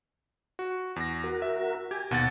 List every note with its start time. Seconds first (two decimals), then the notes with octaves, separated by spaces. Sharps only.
0.59 F#4
0.96 E2 A#6
1.24 F#4 A#4
1.42 E5
1.91 G4 G#5
2.11 D#2 B2 F#5 A6